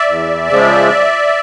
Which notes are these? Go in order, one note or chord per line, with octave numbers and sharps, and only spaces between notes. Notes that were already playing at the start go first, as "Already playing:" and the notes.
Already playing: D5 E5
E2
C#3 F3 G#3